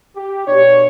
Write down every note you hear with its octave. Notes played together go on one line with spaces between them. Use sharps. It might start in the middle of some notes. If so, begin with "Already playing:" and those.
G4
B2 D4 C#5